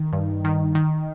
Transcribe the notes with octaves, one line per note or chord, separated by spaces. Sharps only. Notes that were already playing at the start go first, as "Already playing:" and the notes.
Already playing: D#3
G2
D#3
D#3